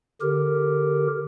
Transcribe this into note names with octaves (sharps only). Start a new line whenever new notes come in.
D3 G4 A#4